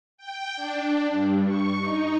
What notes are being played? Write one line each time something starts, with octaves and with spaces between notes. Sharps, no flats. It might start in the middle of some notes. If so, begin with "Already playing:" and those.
G5
D4
G2
C#6
D#4